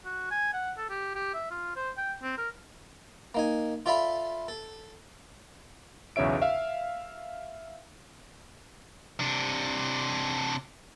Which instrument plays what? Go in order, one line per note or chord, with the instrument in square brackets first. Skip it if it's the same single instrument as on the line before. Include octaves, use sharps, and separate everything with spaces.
[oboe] F#4
G#5
F#5
A4
G4
G4
E5
F4
C5
G5
C4
A#4
[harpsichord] A#3 D#4 G#5
F4 A4 D5 E5 F5 B5
A4
[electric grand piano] B1 E2 C#3 C#5 E5 D7
E5 F5
[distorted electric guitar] C3 D4